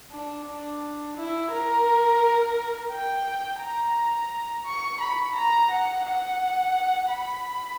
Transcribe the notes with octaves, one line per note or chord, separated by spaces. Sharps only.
D4
D4
E4
A#4
G5
A#5
C#6
B5
A#5
F#5
F#5
B5